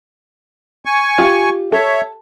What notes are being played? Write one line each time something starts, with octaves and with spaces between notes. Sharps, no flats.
G#5 C#6
F4 G4
A4 C#5 E5